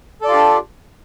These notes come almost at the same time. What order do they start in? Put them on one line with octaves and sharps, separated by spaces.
A4 D5 F4 G4 D4